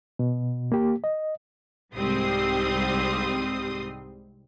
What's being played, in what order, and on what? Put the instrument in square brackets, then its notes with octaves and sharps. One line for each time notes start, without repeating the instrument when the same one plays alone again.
[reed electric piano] B2
A#3 G4
D#5
[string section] C2 G#2 G3 C4 C6 D#6